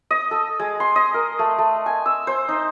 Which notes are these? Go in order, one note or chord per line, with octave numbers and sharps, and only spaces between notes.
D#5
A4
G#3
C6
D#5
A#4
A3
A3
G#5
E6
C5
D#4